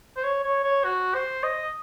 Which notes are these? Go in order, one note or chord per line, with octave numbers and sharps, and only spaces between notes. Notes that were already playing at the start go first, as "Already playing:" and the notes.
C5
C#5
C#5
C#5
F#4
C5
D#5